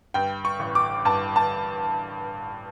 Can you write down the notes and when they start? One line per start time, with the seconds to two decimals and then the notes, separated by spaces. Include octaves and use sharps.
0.14 G2 G5
0.45 C#6
0.59 A1
0.75 D6
1.05 G2 A5
1.36 A5